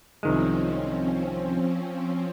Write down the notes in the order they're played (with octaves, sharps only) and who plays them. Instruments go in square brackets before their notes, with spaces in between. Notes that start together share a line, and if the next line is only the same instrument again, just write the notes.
[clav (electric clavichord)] C2 D#3 G#3 [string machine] F3 C4 C#4